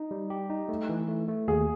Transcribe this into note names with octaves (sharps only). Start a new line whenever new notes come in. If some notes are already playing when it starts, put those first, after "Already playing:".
Already playing: D#4
G3
G4
D#4
A3
E3
A3
A3
D#2 G#4